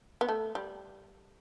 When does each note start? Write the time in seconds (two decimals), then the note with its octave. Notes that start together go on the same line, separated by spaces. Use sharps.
0.21 B3
0.28 A3
0.55 G3